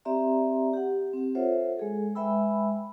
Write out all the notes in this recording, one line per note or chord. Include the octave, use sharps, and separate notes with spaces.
C4 G4 D5 E5 A#5 C6
G4 F#5
C4 G4
F4 A4 C5 C#5 E5 F#5
G#3 G#4 A4
G#3 B4 E5 G5 B5 E6